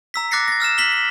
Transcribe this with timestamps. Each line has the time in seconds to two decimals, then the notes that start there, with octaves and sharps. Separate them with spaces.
0.14 A#5 E6 B6
0.31 D6 F#6 A6 A#6 C7 C#7
0.48 A6 A#6
0.60 E6 F6 A#6 E7
0.78 B6 F#7 G7
0.92 B6